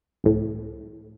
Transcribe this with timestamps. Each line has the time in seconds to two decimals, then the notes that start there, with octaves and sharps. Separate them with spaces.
0.24 C#2 A2